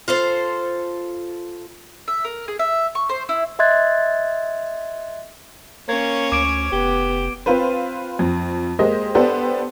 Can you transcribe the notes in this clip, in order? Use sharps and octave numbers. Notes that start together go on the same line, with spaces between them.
F4 A4 C5
E5
A#4
G#4
E5
C#6
C5
E4
D#5 E5 C6 F#6 G#6 A6
A#3 C#4 C#5 G#6
D2 D6 D7
F1 B3 G4
C4 F4 B4 C5
F2
G#3 A#3 G4 C5 D#5
B3 D4 G4 A4 C5